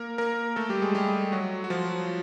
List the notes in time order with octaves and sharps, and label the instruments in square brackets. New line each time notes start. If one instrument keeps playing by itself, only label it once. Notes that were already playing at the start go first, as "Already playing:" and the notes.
Already playing: [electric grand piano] A#3 A#4
A#3 A#4
A3 A4
G3 G4
G#3 G#4
G3 G4
F#3 F#4
F#4
F3 F4